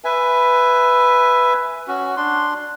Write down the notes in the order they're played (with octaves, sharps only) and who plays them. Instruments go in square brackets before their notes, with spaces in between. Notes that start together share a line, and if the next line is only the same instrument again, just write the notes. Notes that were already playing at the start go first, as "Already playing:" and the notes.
[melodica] B4 E5 G#5
C#4 F#4
D4 C6